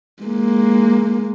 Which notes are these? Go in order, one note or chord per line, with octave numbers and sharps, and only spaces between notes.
G#3 A#3